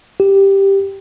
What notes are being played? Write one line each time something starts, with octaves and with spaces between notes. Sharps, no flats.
G4